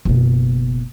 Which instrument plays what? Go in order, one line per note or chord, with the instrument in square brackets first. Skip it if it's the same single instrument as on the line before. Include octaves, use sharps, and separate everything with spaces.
[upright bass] F#1 B2